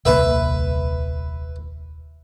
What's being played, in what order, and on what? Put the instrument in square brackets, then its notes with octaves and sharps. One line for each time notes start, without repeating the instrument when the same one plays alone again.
[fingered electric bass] D#1 C2 A#3 [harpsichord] B4 E5